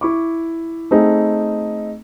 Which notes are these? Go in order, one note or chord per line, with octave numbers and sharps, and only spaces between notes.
E4 C#6 D6
A3 C4 D#4 G#4